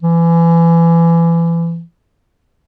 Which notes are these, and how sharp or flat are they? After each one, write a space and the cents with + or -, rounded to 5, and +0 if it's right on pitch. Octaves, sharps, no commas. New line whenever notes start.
E3 +30